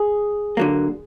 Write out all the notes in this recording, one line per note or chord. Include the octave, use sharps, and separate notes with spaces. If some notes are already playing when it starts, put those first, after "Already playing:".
Already playing: G#4
D3 F#3 A#3